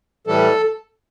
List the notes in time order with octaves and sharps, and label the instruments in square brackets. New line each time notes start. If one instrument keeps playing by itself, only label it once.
[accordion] A2 E3 G3 A4